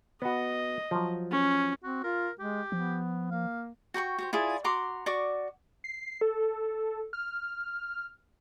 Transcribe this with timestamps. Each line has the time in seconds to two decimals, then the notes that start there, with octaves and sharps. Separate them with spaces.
0.22 B3 F#4 D#5
0.91 F3 F#3
1.31 C#4
1.83 C4 F#4
2.04 F4 A#4
2.40 G#3 G4
2.72 F3 B3
3.31 A#3 F5
3.94 F#4 G5 A#5 C#6
4.18 F#4 G4 C5
4.33 E4 F4 G#4 D5
4.64 F#4 A#5 C6 D6
5.06 F#4 D5 C#6 D6
5.84 C7
6.21 A4
7.13 F6